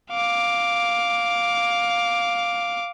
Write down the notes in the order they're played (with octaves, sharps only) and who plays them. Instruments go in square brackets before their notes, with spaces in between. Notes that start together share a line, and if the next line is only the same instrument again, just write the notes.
[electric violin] F5 D6